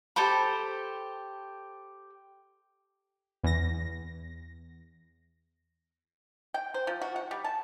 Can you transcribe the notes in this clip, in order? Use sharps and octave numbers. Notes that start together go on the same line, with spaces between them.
G4 A4 C5 B5
E2 A#6
G5
C5
F3
F#4
F#5
G3
A5